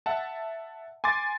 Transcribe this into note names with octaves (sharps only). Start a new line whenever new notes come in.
E5 F#5 A5
G#5 C6 D6 A6